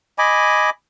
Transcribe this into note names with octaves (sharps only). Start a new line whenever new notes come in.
D#5 G#5 B5 D6